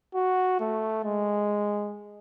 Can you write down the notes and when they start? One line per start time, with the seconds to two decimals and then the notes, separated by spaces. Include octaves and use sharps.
0.15 F#4
0.60 A3
1.05 G#3